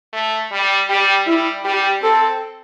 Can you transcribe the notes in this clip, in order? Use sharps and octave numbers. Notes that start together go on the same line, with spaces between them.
A3
G3
G3 G4
G3 E4
G3 G4
C4 A4